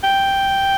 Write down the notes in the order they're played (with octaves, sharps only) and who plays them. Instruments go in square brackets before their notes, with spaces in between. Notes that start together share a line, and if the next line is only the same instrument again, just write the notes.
[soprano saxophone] G5